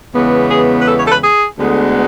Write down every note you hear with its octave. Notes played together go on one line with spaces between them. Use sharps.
E2 C#3 E3 G#3 B3
G#4
B4
A4
C#5
A4
B4
G#4
D2 D3 G#3 B3